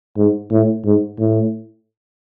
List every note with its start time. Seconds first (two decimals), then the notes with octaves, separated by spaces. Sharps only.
0.17 G#2
0.51 A2
0.85 G#2
1.19 A2